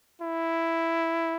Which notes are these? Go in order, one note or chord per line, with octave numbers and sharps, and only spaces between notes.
E4